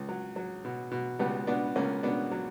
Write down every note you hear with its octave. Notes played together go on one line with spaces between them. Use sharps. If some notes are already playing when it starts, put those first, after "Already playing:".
Already playing: C#2
F#3
F#3
B2
B2
C#2 G3 B3
B2 B3 D4
C#2 A#3 C#4
B2 B3 D4
F#3